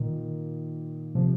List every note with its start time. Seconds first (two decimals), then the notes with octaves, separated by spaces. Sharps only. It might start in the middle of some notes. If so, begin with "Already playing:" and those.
Already playing: A#2 D#3
1.15 C3 F3